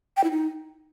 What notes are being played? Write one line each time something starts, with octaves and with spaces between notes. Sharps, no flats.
G5
E4
D#4